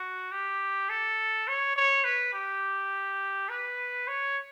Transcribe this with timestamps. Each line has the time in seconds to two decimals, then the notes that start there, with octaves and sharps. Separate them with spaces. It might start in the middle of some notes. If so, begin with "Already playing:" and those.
Already playing: F#4
0.32 G4
0.89 A4
1.48 C#5
1.76 C#5
2.04 B4
2.33 G4
3.49 B4
4.08 C#5